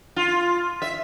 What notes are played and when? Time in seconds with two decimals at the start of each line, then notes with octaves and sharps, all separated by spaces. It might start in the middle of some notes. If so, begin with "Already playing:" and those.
0.16 F4
0.82 E5